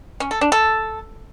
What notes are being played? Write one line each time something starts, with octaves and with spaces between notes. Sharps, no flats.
C#4
A4
D4
A4